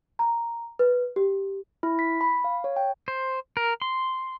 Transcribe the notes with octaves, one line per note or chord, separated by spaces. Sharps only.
A#5
B4
G4
E4
B6
B5
F5
C#5
G5
C5
A#4
C6